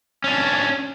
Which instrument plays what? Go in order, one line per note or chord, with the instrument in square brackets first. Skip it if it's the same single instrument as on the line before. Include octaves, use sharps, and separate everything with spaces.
[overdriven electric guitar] C#4 D4